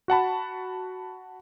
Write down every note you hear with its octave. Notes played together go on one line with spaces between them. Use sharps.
F#4 F#5 A5 B5